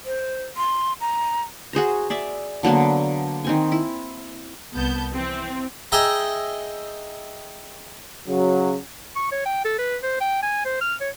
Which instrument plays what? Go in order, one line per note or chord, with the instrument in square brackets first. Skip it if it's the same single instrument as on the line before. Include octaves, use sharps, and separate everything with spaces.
[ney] C5
C6
A#5
[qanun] F#4 G#4 C5 A#5
G#4 D5 E5
D3 F#3 A#3 B3
D#3 C4 G#5
E4
[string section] C2 B3 A5 G6
E3 C4
[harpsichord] G#4 D#5 E5 G5 A#5
[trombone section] C#3 F#3
[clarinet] C#6
C#5
G5
A4
B4
C5
G5
G#5
C5
F6
C#5